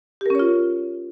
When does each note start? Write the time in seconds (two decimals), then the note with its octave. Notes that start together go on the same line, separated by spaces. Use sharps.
0.21 G4
0.26 A#4
0.30 C#4
0.35 C#5
0.39 F4